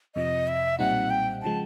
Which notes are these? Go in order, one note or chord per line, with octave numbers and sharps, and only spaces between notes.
F2 C3 F3 D#5
E5
B1 A#2 G3 C4 D#4 F#5
G5
C#3 F3 G#3 A5